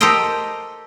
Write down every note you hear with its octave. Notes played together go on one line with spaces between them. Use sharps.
G4 A4 A#4 C5 D#5 G5